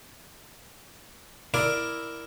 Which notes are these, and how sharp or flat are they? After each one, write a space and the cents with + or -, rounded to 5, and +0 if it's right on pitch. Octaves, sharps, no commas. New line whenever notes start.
E4 +0 A#4 +0 D5 +0